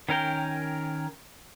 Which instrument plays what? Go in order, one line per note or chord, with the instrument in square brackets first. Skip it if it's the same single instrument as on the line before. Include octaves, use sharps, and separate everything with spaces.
[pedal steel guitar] D#3 C#4 A#4 G5